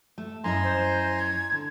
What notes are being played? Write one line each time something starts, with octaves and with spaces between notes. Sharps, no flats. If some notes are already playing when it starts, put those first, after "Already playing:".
A3
F#2 E4 D#5 G#5 A#5 C6
C5
G#6
D3